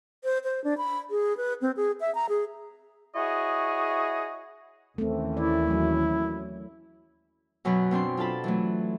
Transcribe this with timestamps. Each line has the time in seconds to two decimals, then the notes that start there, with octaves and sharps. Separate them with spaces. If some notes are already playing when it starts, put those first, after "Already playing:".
0.24 C5
0.44 C5
0.64 D4
0.78 B5
1.11 G#4
1.37 B4
1.62 C4
1.76 G#4
2.00 E5
2.15 A#5
2.29 G#4
3.16 E4 F#4 G#4 C#5 D#5
4.98 D#2 E3 A3 C4 C#4
5.37 E4 D5
5.67 F#3 A3
7.65 F#2 B2 F#3 B4
7.91 B2 C4 D4 C6
8.17 D4 F4 A4 A5 B5
8.44 E3 F#3 A3